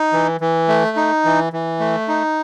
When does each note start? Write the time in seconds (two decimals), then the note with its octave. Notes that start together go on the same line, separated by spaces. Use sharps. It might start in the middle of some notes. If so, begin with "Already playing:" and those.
Already playing: D#4
0.12 E3
0.41 E3
0.68 A3
0.97 D#4
1.25 E3
1.53 E3
1.80 A3
2.08 D#4